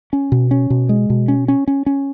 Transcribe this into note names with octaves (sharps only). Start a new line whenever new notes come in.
C#4
B2
C#4
B2
G#3
B2
C#4
C#4
C#4
C#4